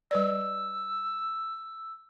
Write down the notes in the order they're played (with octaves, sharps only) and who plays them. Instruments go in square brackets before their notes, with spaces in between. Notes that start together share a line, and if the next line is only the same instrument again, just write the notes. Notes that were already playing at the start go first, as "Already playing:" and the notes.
[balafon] G3 B4 D5 [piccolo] E6